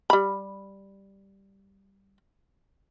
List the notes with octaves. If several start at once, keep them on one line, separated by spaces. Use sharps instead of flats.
G3 B5